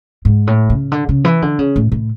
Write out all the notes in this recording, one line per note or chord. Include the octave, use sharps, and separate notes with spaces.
G#2
A2
C#3
D3
C#3
E3
D3
C#3
A2
A2